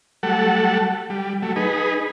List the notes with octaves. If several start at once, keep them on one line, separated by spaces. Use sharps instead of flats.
F#3 G3 A3 A4 F#5
G3
F#3 A3
D#4 G#4 B4